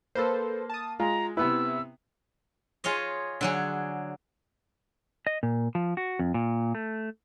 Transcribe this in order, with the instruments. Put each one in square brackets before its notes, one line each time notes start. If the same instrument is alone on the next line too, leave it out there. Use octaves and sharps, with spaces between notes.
[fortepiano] A#3 [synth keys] A4 B4 C5
[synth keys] A5 D#6
[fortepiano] G#3 [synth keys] F4 [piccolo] A#5
[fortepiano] C3 B3 B4 [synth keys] E4 [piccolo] E6
[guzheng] F4 G#4 C#5 D#5
D3 F#3 G#4
[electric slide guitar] D#5
A#2
F3
F#4
F2
A#2
A3